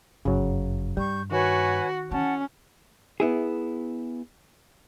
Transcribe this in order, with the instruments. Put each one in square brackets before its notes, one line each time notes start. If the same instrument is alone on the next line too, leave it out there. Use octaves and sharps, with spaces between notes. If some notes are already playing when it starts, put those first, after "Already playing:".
[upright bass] G1 F#2 [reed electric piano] C#3 F#3
[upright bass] G2 [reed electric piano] G3 [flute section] C#6 G6
[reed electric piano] D#3 [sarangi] F#4 [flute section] B4 C#5 G#5
[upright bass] E3 [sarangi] C#4 [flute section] F#5 A5
[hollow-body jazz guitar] B3 E4 G#4